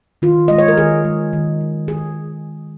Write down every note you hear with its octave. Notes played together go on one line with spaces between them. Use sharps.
D#3 F4
G#3 D#5
C#5
A#4
D#3 G#4
G#3
D#3
G#3
D#3 G#4